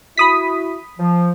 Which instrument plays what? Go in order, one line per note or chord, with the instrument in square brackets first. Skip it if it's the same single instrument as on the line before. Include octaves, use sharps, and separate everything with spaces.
[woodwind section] E4 F#4 [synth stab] B5 D#6 B6
[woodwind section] F3